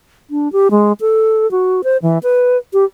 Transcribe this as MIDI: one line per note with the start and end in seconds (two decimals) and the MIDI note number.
0.30 0.51 62
0.53 0.68 67
0.71 0.93 56
1.01 1.49 69
1.51 1.82 66
1.84 1.97 72
2.02 2.18 52
2.23 2.57 71
2.73 2.84 67